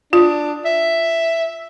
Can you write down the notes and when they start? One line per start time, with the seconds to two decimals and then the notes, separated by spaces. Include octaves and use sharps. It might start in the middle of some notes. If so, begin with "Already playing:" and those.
0.13 D4 F4
0.65 E5